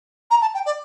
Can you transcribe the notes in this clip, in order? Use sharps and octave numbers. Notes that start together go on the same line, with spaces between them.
A#5
A5
G5
D5